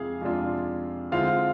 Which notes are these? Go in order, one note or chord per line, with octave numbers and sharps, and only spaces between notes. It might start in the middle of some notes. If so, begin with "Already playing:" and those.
Already playing: F2 C3 G#3 F4 G#4 F5 G#5
F2 C3 G#3 D4 F4
D3 G#3 C4 E4 F4 F5